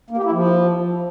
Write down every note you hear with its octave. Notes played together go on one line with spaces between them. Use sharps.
A#3
G4
E4
F3